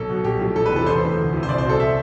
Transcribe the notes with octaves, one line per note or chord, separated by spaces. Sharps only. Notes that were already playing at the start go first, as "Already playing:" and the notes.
Already playing: B1 A4
B2
B1 G4
A2 F3
E1 A4
B4
E2 C3 E3 A4
A1 C5
A2 E3
D2
C3 E3
C5
C2 D5
C5
B2
A4
E5